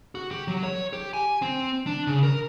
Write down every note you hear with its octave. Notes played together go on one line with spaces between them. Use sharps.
F#4
G4
F#3
C#5
G4
G#5
C4
D4
C#3
A#4